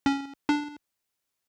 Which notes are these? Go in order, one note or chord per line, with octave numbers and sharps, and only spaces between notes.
C#4
D4